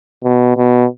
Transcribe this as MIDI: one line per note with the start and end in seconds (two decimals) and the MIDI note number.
0.24 0.54 47
0.57 0.85 47